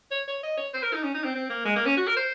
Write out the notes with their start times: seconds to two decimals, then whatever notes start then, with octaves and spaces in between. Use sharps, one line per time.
0.11 C#5
0.28 C#5
0.43 D#5
0.57 C#5
0.73 C5
0.83 A#4
0.93 D#4
1.03 C#4
1.14 D#4
1.24 C4
1.35 C4
1.50 A#3
1.65 G#3
1.76 A#3
1.86 C#4
1.97 F#4
2.07 A#4
2.16 C5